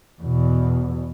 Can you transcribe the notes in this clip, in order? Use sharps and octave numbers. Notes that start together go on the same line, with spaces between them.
E2 B2